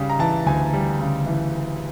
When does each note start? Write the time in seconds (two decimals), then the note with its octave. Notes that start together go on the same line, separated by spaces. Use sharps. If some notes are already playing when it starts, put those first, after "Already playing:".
Already playing: C#3 G3
0.10 A#5
0.19 E3 A5
0.46 D2 G#5
0.73 G3
1.01 C#3
1.26 E3